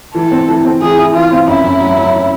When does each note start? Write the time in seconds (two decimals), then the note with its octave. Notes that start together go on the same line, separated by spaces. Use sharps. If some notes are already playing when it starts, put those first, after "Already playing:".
0.15 E3 A4
0.31 C4
0.49 E3
0.65 C4
0.81 E3 G#4
0.99 E4
1.15 E3 F4
1.32 C4
1.47 F#2 E4
1.64 F#2
1.80 F#3
1.98 F#3